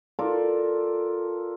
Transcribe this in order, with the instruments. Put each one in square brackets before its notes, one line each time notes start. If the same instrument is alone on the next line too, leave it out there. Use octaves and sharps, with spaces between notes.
[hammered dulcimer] F4 A4 A#4 D5